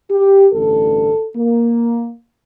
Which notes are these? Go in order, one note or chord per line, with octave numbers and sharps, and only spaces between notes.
G4
A1 G2 D3 A4
A#3